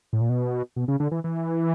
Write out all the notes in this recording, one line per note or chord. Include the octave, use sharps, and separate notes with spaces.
A2
A#2
B2
B2
C#3
D3
E3
E3